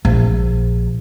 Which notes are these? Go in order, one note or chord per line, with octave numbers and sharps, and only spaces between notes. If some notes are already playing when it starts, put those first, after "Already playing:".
A#1